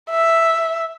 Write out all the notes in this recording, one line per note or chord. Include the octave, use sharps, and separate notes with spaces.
E5